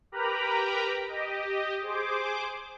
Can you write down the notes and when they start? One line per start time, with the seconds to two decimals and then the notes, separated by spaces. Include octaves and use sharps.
0.12 G4 A#4 B4 A#5 B5
1.07 G4 D#5
1.82 G#4 C5 D6